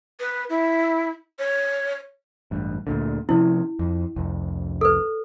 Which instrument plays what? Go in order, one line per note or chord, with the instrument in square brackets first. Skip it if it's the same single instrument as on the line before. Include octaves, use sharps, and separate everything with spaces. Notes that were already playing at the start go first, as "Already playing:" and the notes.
[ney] B4
E4
C#5
[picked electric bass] A1 G2
D2 A#2 D3
[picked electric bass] C3 F3 C#4 [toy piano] E4
[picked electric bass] F2
C2 F2
[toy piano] A4 B4